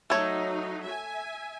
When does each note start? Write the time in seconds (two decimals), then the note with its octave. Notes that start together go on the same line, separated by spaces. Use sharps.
0.10 F#3 A3 D#4 C#5
0.84 E5 G#5